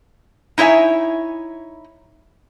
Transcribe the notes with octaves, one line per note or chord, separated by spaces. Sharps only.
D#4 E4 C#5 E5 G#5